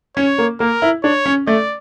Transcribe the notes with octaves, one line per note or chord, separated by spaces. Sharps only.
C#4 C#5
A#3
A#3 A#4
E4
D4 C#5
C#4
A3 D5